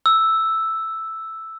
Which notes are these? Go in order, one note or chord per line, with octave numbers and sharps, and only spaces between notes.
E6